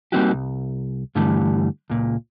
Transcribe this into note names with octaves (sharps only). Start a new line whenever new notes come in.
G3 A#3 C4 D#4 F#4 G4
C2
G2 D3 E3 G3 A3
C#2 A#2